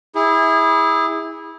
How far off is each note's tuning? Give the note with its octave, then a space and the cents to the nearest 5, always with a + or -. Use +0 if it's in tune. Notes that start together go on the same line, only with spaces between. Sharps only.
E4 -20 G#4 -25